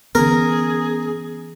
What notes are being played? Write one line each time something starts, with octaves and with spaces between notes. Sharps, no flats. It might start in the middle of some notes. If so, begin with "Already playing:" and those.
D3 E3 B3 C#4 G#4 A#4